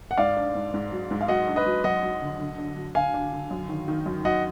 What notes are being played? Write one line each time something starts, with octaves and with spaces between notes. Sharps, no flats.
F#5
G#2 D5 F5
D4
G#2
G#2
F#3
G#2
F5
F#3 D#5 F#5
D4
B4 D#5
F#3
F#2 D#5 F#5
F#3
D3
D3
D4
F#3
D3 F5 G#5
D4
D3
F#2
D#3
D#3
F#2
F#3 D#5 F#5